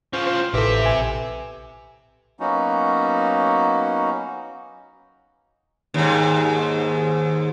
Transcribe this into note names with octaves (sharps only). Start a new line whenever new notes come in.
C#4 F4 C5
C5
A1 C3 E3 G4 A4 E5
A#1 G#5
F#3 A#3 B3 C#4 D#4 F#4
D#2 G#2